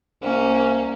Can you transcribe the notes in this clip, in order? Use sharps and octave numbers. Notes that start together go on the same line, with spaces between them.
C2 A#3 C#4